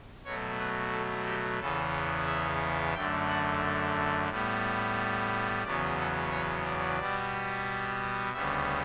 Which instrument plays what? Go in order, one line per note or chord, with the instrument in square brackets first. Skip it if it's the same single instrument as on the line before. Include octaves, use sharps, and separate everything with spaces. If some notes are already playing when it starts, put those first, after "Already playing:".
[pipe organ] B2 F#3 A3 C#5
B4
A4
G4
E2 C#3 E3 B3 A4
E5
F#2 D3 A3 G5
F#5
A2 G3 B3
E2 C#3 F#3 B3 D5
A4
C#5
D5
B2 G3 B3
D2 C#3 G3 B3 E5